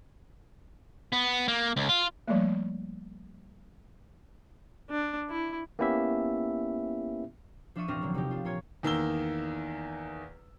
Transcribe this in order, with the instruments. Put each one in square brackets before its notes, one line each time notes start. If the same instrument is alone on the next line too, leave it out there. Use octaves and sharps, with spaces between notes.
[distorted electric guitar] B3
A#3
C#2
F4
[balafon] F3 G3 A3 A#3
[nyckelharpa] D4
E4
[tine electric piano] A#3 B3 C#4 E4 G4 E5
[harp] F3 D4 F4 E5 C#6 D#7
E1 A2 C4 D4 F6 A#6
D3 F#3 A#3
C3 F3 D#4 G4
D4 F4
A#2 A#3 F4 C#5 G#6
[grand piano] E2 D#3 A#3 E6 G7